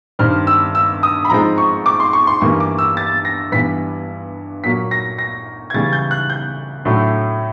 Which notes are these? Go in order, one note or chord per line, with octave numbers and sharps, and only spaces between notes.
G2 D#3 G3 C4 F6
E6
E6
D#6
B5
G#2 F3 G#3 C4 A#5
C#6
D6
C6
C#6
C6
G2 E3 G3 A#3 C#6
D6
E6
A6
A#6
G2 E3 G3 B3 B6
A#2 F#3 A#3 B6
A#6
A#6
G#6
C#3 E3 G3 A6
G6
F#6
G6
A2 F#3 A3 D4